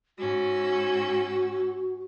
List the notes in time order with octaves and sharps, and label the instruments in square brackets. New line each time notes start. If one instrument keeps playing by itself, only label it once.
[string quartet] G#2 C#4 E6 [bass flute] F#4